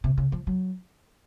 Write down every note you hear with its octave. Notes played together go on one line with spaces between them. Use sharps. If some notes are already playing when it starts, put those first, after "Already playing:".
C3
C#3
F3
F#3